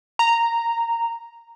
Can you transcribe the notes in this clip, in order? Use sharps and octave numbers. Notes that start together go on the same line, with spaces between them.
A#5